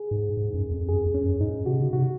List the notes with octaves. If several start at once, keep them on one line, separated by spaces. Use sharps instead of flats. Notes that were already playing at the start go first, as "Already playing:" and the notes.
Already playing: G#4
G#2
G#2
F#2
F2
F#2 G#4
F2
C#4
F#2
G#2 D#4
C3 F#4
C#3
C3 F#4